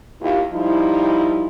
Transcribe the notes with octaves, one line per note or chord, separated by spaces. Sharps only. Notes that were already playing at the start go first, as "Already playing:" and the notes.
D#2 E4 F4 G4
F3 G3 D#4 E4